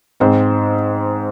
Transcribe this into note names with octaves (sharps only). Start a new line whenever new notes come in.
G#2 G#3 C4 C5